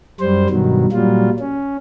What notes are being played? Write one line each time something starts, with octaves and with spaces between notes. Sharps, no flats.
F#2 G3 C5
G2 B2 D#3 F#3
A#2 F#3 G3 F4
C#4